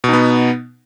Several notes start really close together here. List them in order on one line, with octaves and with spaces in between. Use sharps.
B2 D#4 B3